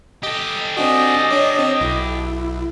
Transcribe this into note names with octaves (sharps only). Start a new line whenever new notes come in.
G4 A4 D#5
C4 D4 F#4 D#5 G#5
D4 C#5 D5
C4
B1 E4